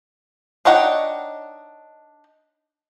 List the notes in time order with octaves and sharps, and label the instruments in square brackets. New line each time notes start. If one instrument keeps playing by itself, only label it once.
[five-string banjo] D4 D#4 C#5 F#5 G5